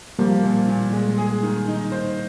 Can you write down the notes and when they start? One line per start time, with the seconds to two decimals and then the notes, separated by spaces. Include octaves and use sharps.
0.19 F3 G3 A#3
0.43 A#2
0.68 A#2
0.93 G#3
1.18 G#4
1.43 D#3
1.68 D#4
1.92 C5